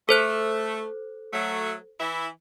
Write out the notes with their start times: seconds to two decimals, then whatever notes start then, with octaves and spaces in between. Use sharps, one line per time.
0.09 A3 A4 C5 F#6
1.33 F#3 A3
2.00 E3 E4